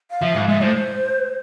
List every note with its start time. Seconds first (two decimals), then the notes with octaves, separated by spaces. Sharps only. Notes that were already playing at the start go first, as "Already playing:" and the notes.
0.11 F5
0.22 F3 E5
0.35 G#2 F5
0.48 G#2 E5
0.61 A2 C5